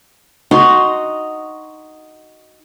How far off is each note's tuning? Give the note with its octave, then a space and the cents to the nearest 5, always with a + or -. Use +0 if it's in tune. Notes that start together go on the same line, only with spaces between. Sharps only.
D#4 +0 F#4 +5 C6 +0